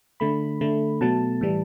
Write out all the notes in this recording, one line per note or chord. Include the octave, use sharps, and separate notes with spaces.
D3 A3 B5
D3 A3
B2 F#3 A3 A5
A2 E3 G3